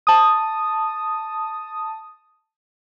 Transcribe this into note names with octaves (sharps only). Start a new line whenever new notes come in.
A5 D#6